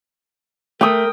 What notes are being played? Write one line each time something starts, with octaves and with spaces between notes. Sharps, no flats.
A3 A#4 G5 D#6